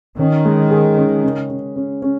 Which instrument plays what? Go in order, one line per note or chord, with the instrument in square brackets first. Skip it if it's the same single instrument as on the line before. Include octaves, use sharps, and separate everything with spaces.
[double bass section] D#3 [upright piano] C#4
[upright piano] G#3
G#4
C#4
C#3
C#3
C#4
C#4